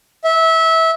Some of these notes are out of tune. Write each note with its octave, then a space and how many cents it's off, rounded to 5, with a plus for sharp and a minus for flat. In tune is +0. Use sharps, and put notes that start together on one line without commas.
E5 -20